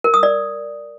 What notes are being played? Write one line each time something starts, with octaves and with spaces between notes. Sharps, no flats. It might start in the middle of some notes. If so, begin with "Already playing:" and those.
A#4
D#6
D5